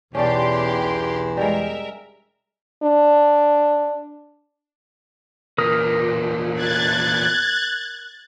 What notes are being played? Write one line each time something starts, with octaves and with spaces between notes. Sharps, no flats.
B1 E2 C#4 D4 G4 D5 C6
G3 G#3 A#4 E5
D4
E2 A#2 A#4 D#6
F#6 G#6 A6